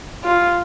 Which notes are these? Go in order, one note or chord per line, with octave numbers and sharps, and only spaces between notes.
F4